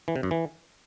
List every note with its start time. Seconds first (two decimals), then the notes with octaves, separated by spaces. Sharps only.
0.08 E3
0.16 C3
0.23 F#2
0.31 E3